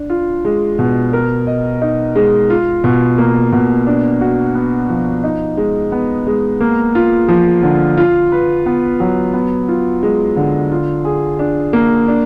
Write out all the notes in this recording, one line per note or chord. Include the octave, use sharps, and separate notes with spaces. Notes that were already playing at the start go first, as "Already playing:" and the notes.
Already playing: D4
F4
G#3
B2
A#4
D#5
D#4
G#3
F4
B2
A#3
B2
D4
F#4
B3
F3
D#4
G#3
B3
G#3
A#3
F4
F3
D3
F4
B4
B3
F#3
B3
F4
G#3
D3
F4
G#4
D4
A#3
D4